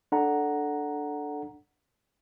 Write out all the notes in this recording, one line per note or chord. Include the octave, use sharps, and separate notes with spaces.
D4 A4 F#5 A#5